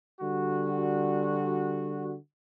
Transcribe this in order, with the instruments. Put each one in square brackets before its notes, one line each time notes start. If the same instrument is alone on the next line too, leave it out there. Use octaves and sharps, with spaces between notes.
[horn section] D3 G3 F#4